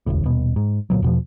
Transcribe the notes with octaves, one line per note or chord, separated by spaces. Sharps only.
E1 A1 D2 A2
D#1 B2
G#2
D2 A#2 D#3 F#3
E2 B2 F3